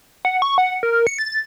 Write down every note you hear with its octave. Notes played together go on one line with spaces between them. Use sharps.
F#5
C#6
F#5
A#4
C#7
A6